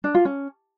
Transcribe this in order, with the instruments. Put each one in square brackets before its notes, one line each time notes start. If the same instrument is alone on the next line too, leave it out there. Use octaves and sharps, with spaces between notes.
[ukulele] D4
F4
C#4